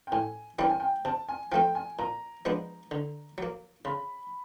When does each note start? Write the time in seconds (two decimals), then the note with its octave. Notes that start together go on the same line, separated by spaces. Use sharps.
0.07 G5
0.12 A2 G#5
0.58 E3 G3 A#3 C#4 G5
0.70 G#5
0.80 G5
1.05 C3 A5
1.29 G#5
1.52 F3 A3 C4 G5
1.75 G#5
1.99 A#2 A#5
2.45 F3 G#3 B3 D4
2.91 D3
3.38 F#3 A#3
3.85 C#3 B5